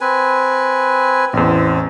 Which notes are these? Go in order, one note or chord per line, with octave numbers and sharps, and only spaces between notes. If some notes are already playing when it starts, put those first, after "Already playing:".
C4 B4 G#5
A1 E2 C4